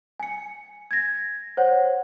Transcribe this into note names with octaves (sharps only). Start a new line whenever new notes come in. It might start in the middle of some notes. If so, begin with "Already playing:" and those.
G#5 C#7
G#6 A#6
C5 C#5 F#5